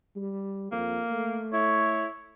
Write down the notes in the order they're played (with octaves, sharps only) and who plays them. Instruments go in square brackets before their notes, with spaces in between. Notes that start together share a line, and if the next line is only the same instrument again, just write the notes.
[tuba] G3
[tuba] F2 [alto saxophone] A#3
[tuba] A3
[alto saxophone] E4 [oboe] C#5